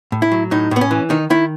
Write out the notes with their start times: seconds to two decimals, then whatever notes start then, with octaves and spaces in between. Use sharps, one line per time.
0.12 A2
0.22 E4
0.32 F#3
0.51 A2 D#4
0.71 A2 B3
0.81 C#4
0.91 E3
1.10 D#3 D#4
1.30 D#3 E4